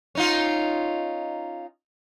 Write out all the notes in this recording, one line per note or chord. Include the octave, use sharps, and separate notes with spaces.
C#4 D#4 F4